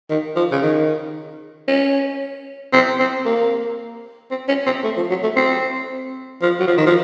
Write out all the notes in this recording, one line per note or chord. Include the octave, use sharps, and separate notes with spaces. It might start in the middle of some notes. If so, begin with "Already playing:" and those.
D#3
F3
C#3
D#3
C#4
C4
C4
A#3
C4
C#4
C4
A3
F3
F#3
A3
C4
F3
F#3
F3
D#3
F3